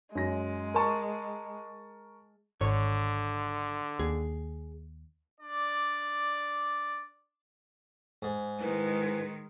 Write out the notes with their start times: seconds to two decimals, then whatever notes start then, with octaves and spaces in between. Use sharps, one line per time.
0.15 F#2 G#3 A#6
0.74 A#4 A5 C#6
2.61 G#1 D3 C#5
3.99 D#2 G#4
5.40 D4 D5
8.22 G#2
8.60 D#3 G#3 E4 B4